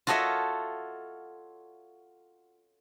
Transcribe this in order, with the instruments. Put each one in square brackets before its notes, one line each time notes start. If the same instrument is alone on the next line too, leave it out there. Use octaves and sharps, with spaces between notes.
[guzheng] F4 F#4 A4 C#5 D#5 E5